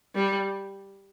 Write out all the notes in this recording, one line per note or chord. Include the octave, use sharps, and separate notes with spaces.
G3